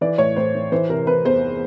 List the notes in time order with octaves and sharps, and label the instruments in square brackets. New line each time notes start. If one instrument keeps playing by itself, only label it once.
[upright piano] E3 D5
A2 C#5
A2 C5
E3
E3 C5
C3 A#4
E3 B4
E2 C5